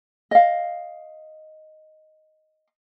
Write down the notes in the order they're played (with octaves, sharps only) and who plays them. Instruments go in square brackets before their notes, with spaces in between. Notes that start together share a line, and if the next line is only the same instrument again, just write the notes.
[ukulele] D#5 F5